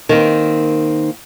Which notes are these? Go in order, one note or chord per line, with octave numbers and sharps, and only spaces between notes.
D#3 A#3 C4